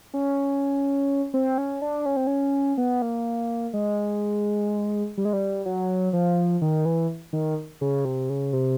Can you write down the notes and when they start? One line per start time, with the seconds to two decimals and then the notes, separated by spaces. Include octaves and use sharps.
0.14 C#4
1.34 C4
1.58 C#4
1.82 D4
2.06 C#4
2.16 C4
2.27 C#4
2.78 B3
3.02 A#3
3.73 G#3
5.17 G3
5.25 G#3
5.33 G3
5.66 F#3
6.13 F3
6.62 D#3
6.85 E3
7.33 D#3
7.81 C#3
8.05 C3
8.29 C#3
8.53 C3